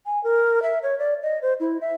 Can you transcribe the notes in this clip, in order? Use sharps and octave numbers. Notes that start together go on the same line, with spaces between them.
G#5
A#4
E5
C#5
D5
D#5
C5
E4
E5